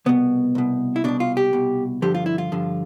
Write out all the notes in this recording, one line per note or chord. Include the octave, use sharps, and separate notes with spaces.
C2 B2 B3
C2 B2
E4
C2 B2 D4
F4
G4
C2 B2
G2 D3 F3 G4
F4
E4
F4
G2 D3 F3